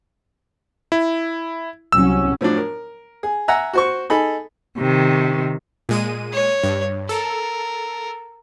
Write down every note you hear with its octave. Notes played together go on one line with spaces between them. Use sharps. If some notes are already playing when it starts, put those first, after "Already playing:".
E4
C2 F#3 C#4 E6
A2 F3 F#3 D4
A#4
G#4
E5 F#5 G#5 A#5 E6
F#4 C5 C#6
D#4 G#4 A4 B5
C3 D#3
A#2 G#3 D#7
C#5
G2
A4 A#4